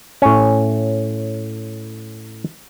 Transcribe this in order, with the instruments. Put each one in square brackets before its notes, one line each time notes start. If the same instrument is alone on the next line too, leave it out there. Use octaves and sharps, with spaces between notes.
[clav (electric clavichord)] A2 C#4